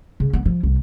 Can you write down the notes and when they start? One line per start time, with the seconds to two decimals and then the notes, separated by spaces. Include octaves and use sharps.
0.20 C#3
0.33 B3
0.46 F3
0.63 C2